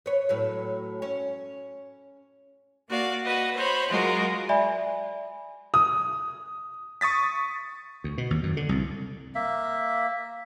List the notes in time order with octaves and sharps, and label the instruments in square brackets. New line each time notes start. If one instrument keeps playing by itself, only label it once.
[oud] B4 C#5
A2 F#3 B4
C#4
[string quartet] A#3 F#4 D5 F5
F#4 B4 D#5
C5 C#5 B5
F#3 G#3 F4 F#4 A#4
[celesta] D5 E5 G#5 B5
[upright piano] D#6
[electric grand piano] C#6 D#6 A6 B6
[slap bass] D2
B2
D#2
F#2
D3
C2
[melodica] A#3 E5